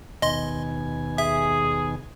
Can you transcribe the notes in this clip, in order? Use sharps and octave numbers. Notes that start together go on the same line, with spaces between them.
D#2 B2 D#5 G#5 C6
G#4 E5